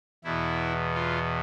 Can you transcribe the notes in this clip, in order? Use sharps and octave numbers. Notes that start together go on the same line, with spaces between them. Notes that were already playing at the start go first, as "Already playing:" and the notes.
E2 B2 E4
F4